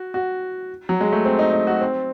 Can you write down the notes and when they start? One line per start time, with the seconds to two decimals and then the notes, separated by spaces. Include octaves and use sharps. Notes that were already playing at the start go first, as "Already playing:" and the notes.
Already playing: F#4
0.14 F#4
0.89 F#3
1.01 G#3
1.12 A3
1.25 C4
1.39 D#4
1.52 D#4
1.67 F#4
1.81 C4